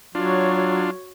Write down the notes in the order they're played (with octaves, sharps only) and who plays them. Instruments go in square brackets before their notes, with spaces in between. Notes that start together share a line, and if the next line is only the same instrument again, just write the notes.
[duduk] F#3 [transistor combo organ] D4 F4 [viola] F#4 C#5